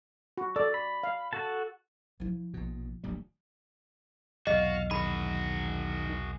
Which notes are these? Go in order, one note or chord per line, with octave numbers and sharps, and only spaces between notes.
F#4
A4 D5
B5
F5
F#4 A4 A5
F3 E4
A#1 B2
D1 A#1 G3
B1 E2 C3 F#4 D#5 F5
D#3 F#4 G#4 B5